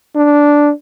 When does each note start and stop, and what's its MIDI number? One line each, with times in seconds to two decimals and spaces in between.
0.16 0.71 62